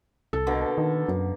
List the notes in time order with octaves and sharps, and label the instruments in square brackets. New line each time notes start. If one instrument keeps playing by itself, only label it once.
[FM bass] C2 [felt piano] A4
[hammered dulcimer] B2 D3 A#3
[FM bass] D#3
F#2